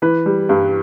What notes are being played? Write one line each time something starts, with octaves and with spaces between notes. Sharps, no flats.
E3 B4
G3
G2